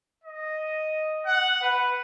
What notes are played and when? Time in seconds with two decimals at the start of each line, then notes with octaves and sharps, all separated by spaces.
0.24 D#5
1.26 F#5
1.62 B4